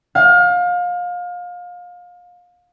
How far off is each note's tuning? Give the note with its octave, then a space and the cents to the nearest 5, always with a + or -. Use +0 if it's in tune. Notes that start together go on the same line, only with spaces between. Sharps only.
F5 +30